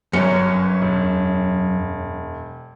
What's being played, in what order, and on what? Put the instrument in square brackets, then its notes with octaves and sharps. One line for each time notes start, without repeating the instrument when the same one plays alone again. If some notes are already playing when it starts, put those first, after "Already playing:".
[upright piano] G1 C#4 C#7 [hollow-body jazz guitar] F#2
[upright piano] E1